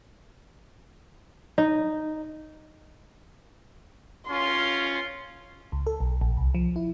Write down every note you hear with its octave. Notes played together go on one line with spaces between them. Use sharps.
D#4
C#4 F4 C6
C#2
A4
B1
A#1
C2
F3
E4